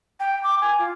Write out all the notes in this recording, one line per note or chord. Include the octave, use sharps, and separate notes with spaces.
G5
D6
G#5
F4